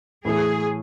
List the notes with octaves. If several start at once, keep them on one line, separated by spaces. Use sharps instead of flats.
A2 E3 A3 E4 G#4